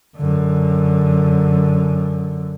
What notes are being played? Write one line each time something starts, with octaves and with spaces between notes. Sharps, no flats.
F#2 D3